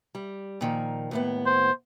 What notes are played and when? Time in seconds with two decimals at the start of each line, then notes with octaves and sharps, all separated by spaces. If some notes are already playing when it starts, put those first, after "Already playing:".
0.15 G3
0.61 A#2 D#3 F3
1.11 D#2 A2 B3
1.46 C5